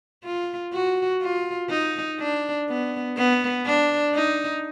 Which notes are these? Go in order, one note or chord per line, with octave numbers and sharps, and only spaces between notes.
F4
F#4
F4
D#4
D4
B3
B3
D4
D#4